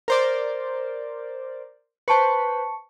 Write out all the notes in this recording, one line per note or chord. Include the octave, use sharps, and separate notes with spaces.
A#4 C5 D5
B4 C5 A5 C#6 C#7